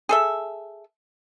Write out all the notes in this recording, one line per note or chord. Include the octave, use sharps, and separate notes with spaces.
G#4 A4 E5